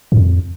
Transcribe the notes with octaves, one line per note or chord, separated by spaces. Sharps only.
G2
F2